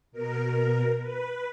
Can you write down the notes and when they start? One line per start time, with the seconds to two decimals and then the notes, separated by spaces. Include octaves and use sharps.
0.12 B2 A#4
1.00 B4